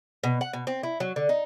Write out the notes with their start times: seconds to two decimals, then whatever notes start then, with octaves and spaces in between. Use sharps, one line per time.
0.23 B2
0.41 F#5
0.53 B2
0.67 C4
0.83 E4
1.00 F#3
1.16 D3
1.29 D#4